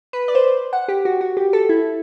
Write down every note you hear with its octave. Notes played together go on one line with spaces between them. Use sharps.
B4
D5
C5
F#5
G4
F#4
F#4
G4
A4
E4